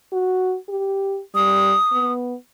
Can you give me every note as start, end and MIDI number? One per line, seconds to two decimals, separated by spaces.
0.12 0.56 66
0.69 1.20 67
1.35 1.75 55
1.35 2.12 87
1.92 2.35 59